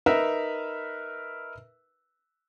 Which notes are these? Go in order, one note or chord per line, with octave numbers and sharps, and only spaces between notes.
D#4 A#4 B4 E5